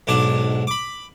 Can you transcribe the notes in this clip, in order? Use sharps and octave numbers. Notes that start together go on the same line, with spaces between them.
B1 G#2 D4 D6
B5 D6